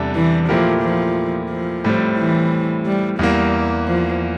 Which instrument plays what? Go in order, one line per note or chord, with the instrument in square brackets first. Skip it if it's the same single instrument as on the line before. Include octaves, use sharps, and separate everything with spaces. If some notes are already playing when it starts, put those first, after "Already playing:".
Already playing: [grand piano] E2 C3 G3 D4 A4
[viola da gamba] E3
[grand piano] A#2 A3 E4 G4 A#4 [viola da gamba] F3
[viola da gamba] F3
F3
[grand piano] A2 G3 C4
[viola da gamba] E3
G3
[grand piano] E2 E3 A#3 [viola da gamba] G3
[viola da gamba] F3